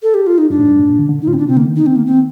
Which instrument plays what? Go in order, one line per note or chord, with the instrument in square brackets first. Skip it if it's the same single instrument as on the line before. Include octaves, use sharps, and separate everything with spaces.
[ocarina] A4
G4
F4
D#4
[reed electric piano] G2 [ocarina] D4
[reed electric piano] A2
G2
A2
A#2
D3
D3
[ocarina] D#4
[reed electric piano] A2 [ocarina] F4
[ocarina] C4
D4
[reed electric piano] C3 [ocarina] C4
[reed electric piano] D3 [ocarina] A#3
[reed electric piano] D#3
[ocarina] D#4
C4
A#3
C4